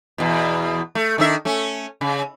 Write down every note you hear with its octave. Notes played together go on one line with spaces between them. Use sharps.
E2 B2
A3
D#3 D4 E5
A3 C#4
C#3